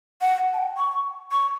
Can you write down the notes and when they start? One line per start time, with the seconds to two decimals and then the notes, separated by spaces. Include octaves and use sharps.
0.21 F#5
0.53 A5
0.58 G5
0.77 C#6
1.32 C#6